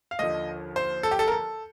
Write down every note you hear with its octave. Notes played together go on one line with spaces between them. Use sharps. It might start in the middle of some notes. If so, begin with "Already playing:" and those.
F5
D#2 D3 F3 D#5
C5
A4
G4
A4
A#4
A4